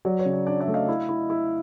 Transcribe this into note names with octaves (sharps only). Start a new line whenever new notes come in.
F#3 D5
C#5
C#3
D5
D4 D5
D5 E5
A3
D#5 F5
E4
E4
E4